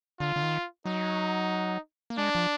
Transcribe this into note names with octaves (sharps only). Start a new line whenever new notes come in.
D3 F4
D3
D#3
F#3 D#4
A#3
G#3 D4
F3